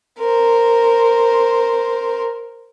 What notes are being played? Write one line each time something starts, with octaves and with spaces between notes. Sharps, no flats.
A#4 C5